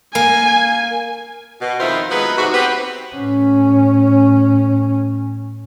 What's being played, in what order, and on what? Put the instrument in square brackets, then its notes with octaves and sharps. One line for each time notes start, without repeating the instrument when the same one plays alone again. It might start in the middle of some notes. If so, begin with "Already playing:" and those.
[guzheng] A#3 [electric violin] G#5
[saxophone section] B2
F2 D#3 E4 F4 C5
F#3 G#3 B3 B4
G#2 C3 F#4
B3 C4 G4 B4
[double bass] A2 C#4